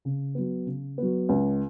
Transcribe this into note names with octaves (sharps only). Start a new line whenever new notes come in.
C#3
F#3 B3
C#3
F#3 B3
C#2